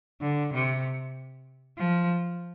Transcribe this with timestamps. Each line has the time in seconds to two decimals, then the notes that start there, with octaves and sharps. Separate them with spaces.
0.21 D3
0.53 C3
1.77 F3